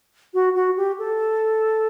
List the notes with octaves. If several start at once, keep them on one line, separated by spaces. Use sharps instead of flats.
F#4
F#4
G4
A4